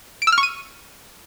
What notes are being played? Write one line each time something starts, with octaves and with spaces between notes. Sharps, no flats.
D7
E6
F6
C#6
D#7